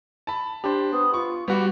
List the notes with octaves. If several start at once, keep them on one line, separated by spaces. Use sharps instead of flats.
A5 B5
D4 G4 C5
B3 D#6
F4 C#6
G3 B3 F#4 G4